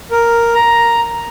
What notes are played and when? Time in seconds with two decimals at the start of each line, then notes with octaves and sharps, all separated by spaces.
0.11 A#4
0.54 A#5